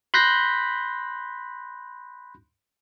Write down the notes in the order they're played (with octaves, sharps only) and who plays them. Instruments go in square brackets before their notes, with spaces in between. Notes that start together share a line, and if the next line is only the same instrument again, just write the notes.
[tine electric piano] B5 C6 F#6 G6 A#6 B6